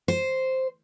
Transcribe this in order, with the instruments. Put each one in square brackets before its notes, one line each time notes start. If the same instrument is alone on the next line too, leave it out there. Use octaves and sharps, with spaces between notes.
[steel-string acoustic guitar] C5